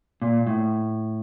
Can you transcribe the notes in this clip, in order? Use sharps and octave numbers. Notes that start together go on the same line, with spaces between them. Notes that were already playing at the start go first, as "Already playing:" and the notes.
A#2
A2